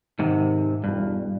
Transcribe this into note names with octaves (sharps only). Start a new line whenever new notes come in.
G#2 C3 D#3
E1 G2